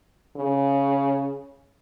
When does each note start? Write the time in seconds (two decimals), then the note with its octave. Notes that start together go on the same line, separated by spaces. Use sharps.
0.36 C#3